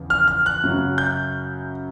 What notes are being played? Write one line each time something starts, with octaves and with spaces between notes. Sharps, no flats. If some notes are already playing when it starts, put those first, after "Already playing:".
Already playing: E2 C#3 F3
F6
F6
F#6
F#2 C#3 F#3
G6